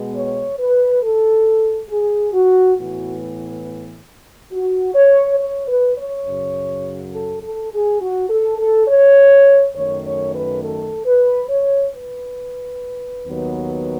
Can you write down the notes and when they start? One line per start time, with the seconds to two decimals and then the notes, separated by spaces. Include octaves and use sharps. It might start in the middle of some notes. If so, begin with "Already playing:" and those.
Already playing: B2 G#3 B3
0.16 C#5
0.59 B4
1.03 A4
1.90 G#4
2.33 F#4
2.77 A2 E3 B3 F#4
4.52 F#4
4.95 C#5
5.39 C#5
5.68 B4
5.97 C#5
6.26 F#2 C#3 F#3
7.13 A4
7.42 A4
7.72 G#4
8.01 F#4
8.29 A4
8.59 A4
8.88 C#5
9.75 F#2 D#3 A3 C#5
10.04 C#5
10.34 B4
10.62 A4
11.06 B4
11.49 C#5
11.93 B4
13.23 D#2 D#3 F#3 B3